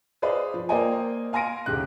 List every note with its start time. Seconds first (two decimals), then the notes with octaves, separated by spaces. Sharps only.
0.22 G#4 B4 C5 D5 D#5 F5
0.54 F3
0.69 A#3 C5 D5 D#5 G5 G#5
1.33 F5 G#5 C6 A#6 D7 D#7
1.66 D#1 G#2 C#3 G4 F#6